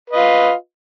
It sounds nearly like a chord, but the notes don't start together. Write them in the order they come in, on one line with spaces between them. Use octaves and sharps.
B4 D#5 F4